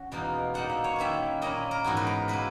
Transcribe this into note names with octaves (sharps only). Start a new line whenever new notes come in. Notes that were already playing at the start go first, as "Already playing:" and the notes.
Already playing: C#4 F#4
E2 B2 A#3 D#4
A#2 A#3 D#4 F#5
E5
C#5
D#3 A#3 C#4 E4 E5
A#2 A#3 C#4 E4 D#5
A#4
G#2 E3 B3 E4 F#4
B4
A#4
B2 A#3 E4 B4